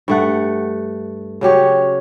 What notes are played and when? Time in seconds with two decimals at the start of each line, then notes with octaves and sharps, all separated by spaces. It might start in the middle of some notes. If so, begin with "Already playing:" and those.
0.08 G2 A3 F#5
1.41 C#3 F#3 G4 C#5